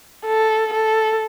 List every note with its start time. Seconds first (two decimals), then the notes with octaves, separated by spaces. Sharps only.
0.26 A4
0.73 A4